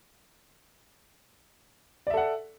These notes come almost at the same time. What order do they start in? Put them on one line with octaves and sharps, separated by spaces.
D5 E5 A4 F#5